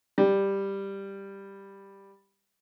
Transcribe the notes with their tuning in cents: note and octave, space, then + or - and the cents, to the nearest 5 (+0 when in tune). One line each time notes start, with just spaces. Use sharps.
G3 +5